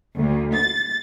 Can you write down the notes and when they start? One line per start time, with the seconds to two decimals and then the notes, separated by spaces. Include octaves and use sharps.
0.17 D2
0.55 A6